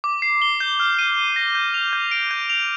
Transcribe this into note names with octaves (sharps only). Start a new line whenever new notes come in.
D6
C7
G7
G6
F6
D#7
G7
A#6
G6
F7
G6
D7
G6
F7